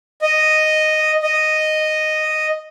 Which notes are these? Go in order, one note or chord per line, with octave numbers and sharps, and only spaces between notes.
D#5
D#5